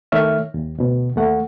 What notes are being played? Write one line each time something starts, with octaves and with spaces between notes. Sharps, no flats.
D#3 A3 C#5 E5 F6
D#2
D2 B2
D#2 A3 F#5